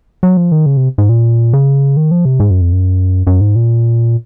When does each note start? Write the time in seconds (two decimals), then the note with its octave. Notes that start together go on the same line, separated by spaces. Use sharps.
0.23 F#3
0.37 F3
0.52 D#3
0.66 C#3
0.77 C3
0.98 G#2
1.09 A#2
1.53 C#3
1.97 D#3
2.11 F3
2.25 C3
2.40 G#2
2.50 F#2
2.61 F2
2.73 F#2
3.27 F#2
3.41 G#2
3.56 A#2